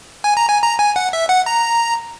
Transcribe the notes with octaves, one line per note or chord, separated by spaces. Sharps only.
G#5
A#5
G#5
A#5
G#5
F#5
E5
F#5
A#5